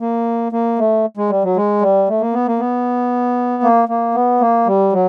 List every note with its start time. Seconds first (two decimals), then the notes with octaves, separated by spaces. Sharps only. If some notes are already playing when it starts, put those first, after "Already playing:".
0.01 A#3
0.52 A#3
0.79 A3
1.17 G#3
1.30 G3
1.44 F#3
1.56 G#3
1.82 G3
2.09 A3
2.21 A#3
2.33 B3
2.47 A#3
2.59 B3
3.63 A#3
3.89 A#3
4.15 B3
4.41 A#3
4.67 G3
4.93 F#3